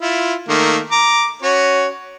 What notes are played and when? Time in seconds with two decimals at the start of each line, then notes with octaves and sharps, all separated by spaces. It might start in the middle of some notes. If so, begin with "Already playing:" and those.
0.02 E4 F4
0.49 D#3 A3 A#3
0.92 A#5 D6
1.43 C#4 F#4 C#5